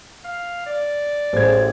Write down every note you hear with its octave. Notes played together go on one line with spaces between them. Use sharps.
F5
D5
A1 G#4 C5 G#6